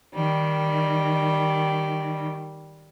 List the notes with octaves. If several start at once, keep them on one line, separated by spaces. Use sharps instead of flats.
D#3 G3